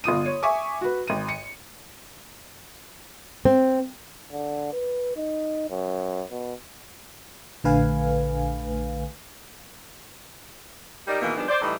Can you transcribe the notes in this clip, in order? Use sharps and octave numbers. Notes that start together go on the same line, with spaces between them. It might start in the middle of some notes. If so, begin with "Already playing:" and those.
G1 F4 D#6 D#7
C#5
E5 G#5 C#6 D6
F#4 B4
G#1 D#7
C#7
C4
D3
B4
D#4
F#2
B2
A#1 D3 A3 B4 F5 G#5
G3 D#4 G4 A#4 D5
B2 D#3 E3 G#3 A#3
D#3 F3 G3 G#3 B3 D4
C5 D5
A2 E3 G3 D#4